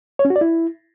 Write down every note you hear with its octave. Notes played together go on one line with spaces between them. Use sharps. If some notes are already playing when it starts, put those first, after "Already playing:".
C#5
C#4
F#4
D5
E4